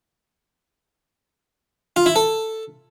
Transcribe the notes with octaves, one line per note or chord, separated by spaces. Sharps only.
F4
E4
A4